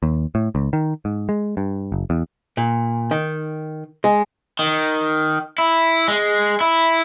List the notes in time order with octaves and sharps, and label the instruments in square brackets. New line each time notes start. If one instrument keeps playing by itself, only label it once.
[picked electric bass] D#2
A2
C#2
D#3
G#2
G#3
G2
F#1
E2
[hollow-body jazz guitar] A#2
D#3
G#3
[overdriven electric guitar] D#3
E4
G#3
E4